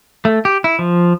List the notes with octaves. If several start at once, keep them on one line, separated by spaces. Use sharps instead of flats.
A3
G4
E4
F3